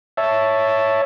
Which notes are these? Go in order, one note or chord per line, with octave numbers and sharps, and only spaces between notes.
C#5 E5 A5